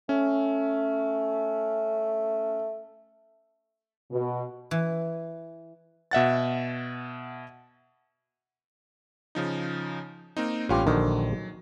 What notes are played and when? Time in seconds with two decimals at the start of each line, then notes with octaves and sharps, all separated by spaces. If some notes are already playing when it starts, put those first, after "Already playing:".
0.09 A3 C#4
4.11 B2
4.71 E3
6.11 B2 E5 F#5 A6
9.35 C#3 F3 D#4
10.37 A#3 C4 D#4
10.69 A1 G2 C#4 F4 G4
10.87 A#1 D3 D#3 F#3